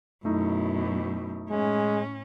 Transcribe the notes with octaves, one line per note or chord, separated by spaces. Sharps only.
F#2 B2 A3 D#4 E4
A2 G#3 C#4